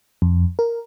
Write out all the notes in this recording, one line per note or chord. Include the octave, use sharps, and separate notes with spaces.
F2
A#4